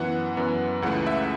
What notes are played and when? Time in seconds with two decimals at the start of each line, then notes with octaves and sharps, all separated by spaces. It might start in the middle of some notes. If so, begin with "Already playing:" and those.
Already playing: F#2 E3 B3 F#5
0.37 F#2 E3 B3
0.82 C#2 C#3 E3 A3 F#5
1.07 E5